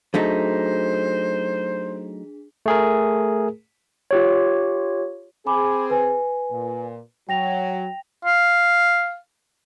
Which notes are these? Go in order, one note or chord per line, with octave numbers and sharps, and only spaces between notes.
F#3 A3 D4 D#4 G#4 C5 B6
A3 G#4 A#4
F4 G4 C#5
C4 G#4 G#5 B5 D6
B4 G#5
A#2
F#3 G5 A#6 F7
F5